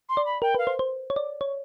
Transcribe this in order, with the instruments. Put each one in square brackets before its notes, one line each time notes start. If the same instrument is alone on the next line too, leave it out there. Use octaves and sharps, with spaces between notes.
[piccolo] C6
[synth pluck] D5
[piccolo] B5
[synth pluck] A#4 [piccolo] G5
[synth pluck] B4 [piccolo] F5
[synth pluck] C5
C5
C#5
D5
C#5